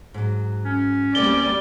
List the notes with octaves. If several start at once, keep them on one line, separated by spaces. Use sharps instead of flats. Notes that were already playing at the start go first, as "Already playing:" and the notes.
G#2 F#3
C#4
D2 G3 A#3 C4 D5 G7